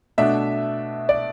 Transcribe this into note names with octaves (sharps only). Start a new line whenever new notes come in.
B2 A3 D4 E5
D5